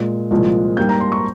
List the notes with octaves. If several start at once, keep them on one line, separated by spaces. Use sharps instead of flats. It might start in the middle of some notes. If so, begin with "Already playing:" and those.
Already playing: A#2 G#3
C2 A#2 F3 G#3
G#2 G3 A#3 G6
A#5
C6
C#6